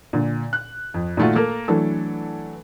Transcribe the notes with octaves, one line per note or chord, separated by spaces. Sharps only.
A#2 D3
F#6
F2
A#2 D#3 A3 F4 F#4
A#3 A4 A#4
E3 F#3 A3 D4 A4